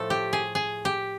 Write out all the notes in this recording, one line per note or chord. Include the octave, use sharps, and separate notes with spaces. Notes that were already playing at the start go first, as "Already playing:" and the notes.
Already playing: A2 F3 A3 A4
G4
G#4
G#4
G4